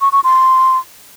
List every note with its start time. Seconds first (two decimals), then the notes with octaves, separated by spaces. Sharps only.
0.01 C#6
0.12 C#6
0.24 C6